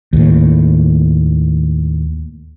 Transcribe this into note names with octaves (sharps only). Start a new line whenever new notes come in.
D#2 A2